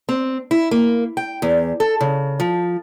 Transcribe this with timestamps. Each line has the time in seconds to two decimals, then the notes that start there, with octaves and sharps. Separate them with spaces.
0.09 C4
0.51 E4
0.71 A#3
1.17 G5
1.42 E2
1.80 A4
2.01 C#3
2.40 F3